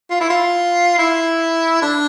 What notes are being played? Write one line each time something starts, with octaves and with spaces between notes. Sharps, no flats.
F4
E4
F4
E4
D4